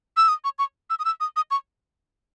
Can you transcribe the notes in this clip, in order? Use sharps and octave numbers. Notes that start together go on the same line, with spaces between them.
E6
D#6
C#6
C#6
E6
D#6
E6
D#6
D#6
C#6